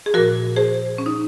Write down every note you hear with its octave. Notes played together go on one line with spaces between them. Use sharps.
G#4
A#2 F3 F#4 A#4
G#4 C5
C#4
D#4